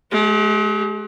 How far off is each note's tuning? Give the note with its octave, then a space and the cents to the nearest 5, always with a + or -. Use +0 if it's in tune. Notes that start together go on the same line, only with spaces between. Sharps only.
G#3 +45 G4 +0